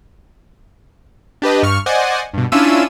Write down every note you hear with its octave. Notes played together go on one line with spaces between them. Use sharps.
D4 G4 B4 D#5
G2 C#6 F6
C5 D5 D#5 F#5 G#5
G2 B2
C#4 D4 E4 F4 E6 D#7